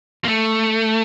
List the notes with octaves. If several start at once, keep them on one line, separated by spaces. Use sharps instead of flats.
A#3
A3